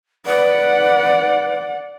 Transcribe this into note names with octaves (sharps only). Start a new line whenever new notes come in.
B4 D5 F#5